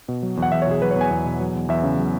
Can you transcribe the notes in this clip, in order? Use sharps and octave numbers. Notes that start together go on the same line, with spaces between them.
B2
F#3
E2
F#5
E2 E5
C#5
B2 G#4
F#3 B4
C#5
E2
G#5
E2
B2
F#3
E2
E2 E5
C#3
F#3